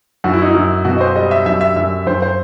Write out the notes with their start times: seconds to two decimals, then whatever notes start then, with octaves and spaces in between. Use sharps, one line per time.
0.24 F#2 F#4
0.33 E4
0.42 D#4
0.50 F#2 E4
0.85 B2 F#4
0.97 D#5
1.01 C5
1.16 G3 D#5
1.31 E5
1.46 F#2 E5
1.61 E5
1.76 F#2 E5
2.06 F#2 C5
2.22 C5